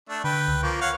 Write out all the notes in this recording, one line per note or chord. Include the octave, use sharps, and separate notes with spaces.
A3 D4
D3 B4 G5
C#2
F3 A#3 C#6
C#5 F5 F#5